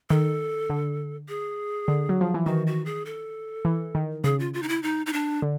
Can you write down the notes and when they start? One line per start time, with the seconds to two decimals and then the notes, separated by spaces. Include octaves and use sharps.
0.10 D#3 A4
0.70 D3
1.28 G#4
1.88 D3
2.09 F#3
2.21 F3
2.34 E3
2.46 D#3 F#4
2.67 F#4
2.86 G#4
3.06 A4
3.65 E3
3.95 D#3
4.24 C#3 G#4
4.39 F4
4.54 F4
4.63 D#4
4.69 E4
4.83 D#4
5.06 D#4
5.13 D4
5.42 D3